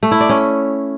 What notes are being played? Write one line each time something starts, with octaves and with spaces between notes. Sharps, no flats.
A3
E4
D5
C#4